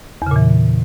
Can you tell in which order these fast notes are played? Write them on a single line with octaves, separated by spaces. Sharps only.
E2 C#3 A#2 E3